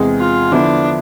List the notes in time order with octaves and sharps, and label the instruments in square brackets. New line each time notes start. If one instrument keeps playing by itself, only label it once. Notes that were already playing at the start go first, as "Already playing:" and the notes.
Already playing: [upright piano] E2 C3 G#3 C4 G#4
[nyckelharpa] F4
[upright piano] D3 F3 B3 E4 [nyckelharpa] D4